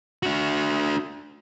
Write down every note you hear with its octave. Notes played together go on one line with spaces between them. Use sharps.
D4 F#4